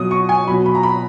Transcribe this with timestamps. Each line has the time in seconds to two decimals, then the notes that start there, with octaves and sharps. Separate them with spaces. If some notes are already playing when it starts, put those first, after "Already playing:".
Already playing: B2 F#3 D#6
0.11 C#6
0.29 G#5
0.47 F#3 B5
0.51 B2
0.66 B5
0.75 A#5
0.83 B5